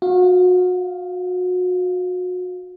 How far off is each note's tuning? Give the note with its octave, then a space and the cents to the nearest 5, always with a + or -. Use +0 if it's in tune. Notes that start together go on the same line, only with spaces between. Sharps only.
F#4 -30 F5 +0